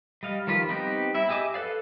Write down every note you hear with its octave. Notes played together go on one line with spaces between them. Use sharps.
G3 D#5 F5
D#3 F3 G3 F4 B4
G3 B3 C4 D#4 G4
E4 E5
G4 G#4 D#5 E5 D6
A4 B4 D5 F5